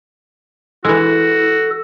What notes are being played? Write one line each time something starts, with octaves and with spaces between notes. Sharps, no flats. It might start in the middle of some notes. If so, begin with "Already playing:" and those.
E3 G#3 E4 F#4 A4